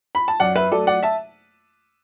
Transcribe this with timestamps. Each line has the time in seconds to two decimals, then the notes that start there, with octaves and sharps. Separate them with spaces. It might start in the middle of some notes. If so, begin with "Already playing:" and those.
0.15 B5
0.28 A5
0.40 F#2 D5 F#5
0.56 B4 E5
0.71 F#3 A3 A4 D5
0.87 D5 F#5
1.03 E5 A5